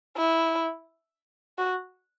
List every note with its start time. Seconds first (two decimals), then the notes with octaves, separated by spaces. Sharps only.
0.17 E4
1.58 F#4